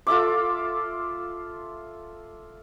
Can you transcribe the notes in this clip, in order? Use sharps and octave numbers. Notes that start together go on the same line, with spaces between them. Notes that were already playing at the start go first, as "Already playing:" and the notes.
F4 A4 E5 D6